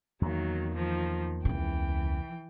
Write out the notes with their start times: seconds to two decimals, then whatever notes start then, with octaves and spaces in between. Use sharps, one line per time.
0.21 E2 D#3 F#3 A#3
0.74 D#3 F3
1.45 C#2 C#3 E3 G5